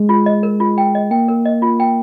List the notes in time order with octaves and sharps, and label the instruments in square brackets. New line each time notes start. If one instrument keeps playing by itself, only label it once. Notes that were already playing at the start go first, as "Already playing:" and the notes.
Already playing: [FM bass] G#3
[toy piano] F4
D#5
A#4
F4
G5
D#5
[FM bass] A#3 [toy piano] G5
[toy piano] A#4
D#5
F4
G5